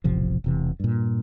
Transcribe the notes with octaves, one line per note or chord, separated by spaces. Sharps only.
E1 A1 C3 F3
E1 C3 E3
G2 A#2